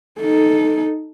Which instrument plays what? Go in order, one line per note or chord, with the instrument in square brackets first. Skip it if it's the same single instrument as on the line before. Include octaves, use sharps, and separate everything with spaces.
[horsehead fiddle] D#4 A4